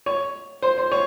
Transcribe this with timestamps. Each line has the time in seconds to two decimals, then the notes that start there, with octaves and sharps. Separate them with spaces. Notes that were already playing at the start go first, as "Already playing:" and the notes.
0.06 C#5
0.62 C5
0.78 C5
0.92 C#5